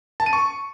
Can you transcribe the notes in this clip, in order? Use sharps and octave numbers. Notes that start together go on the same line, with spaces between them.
A5
D#7
C#6